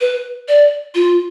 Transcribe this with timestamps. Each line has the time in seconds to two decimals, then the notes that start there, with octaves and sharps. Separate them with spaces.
0.01 B4
0.48 D5
0.95 F4